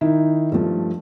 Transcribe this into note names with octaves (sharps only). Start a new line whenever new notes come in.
D#3 D#4 E4
G2 F3 A3